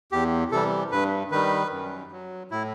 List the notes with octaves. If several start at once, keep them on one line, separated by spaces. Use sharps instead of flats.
E2 G4
C3 E3 G3 A4
G2 B4
D#3 G3 B4
F#2
F#3
A2 E4